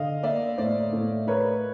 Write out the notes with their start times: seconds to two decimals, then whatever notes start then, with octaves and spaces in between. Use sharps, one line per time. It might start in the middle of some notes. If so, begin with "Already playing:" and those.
Already playing: D3 D#5 F5
0.23 A#3 D5 E5
0.58 A2 C5 D5
0.93 A2
1.27 A#4 B4 C#5